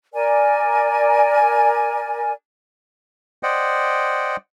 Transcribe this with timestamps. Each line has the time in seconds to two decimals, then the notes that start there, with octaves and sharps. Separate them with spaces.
0.13 A#4 D5 G#5
3.43 C5 D5 D#5 F#5 G5